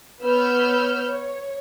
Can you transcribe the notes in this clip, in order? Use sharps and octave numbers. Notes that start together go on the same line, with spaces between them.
B3 B4 C#5 E6 F6 G6
C#5